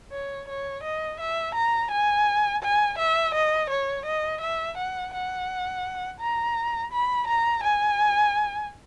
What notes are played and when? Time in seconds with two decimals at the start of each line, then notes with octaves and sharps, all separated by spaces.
0.12 C#5
0.48 C#5
0.83 D#5
1.20 E5
1.55 A#5
1.91 G#5
2.62 G#5
2.98 E5
3.34 D#5
3.70 C#5
4.06 D#5
4.41 E5
4.77 F#5
5.14 F#5
6.20 A#5
6.92 B5
7.27 A#5
7.64 G#5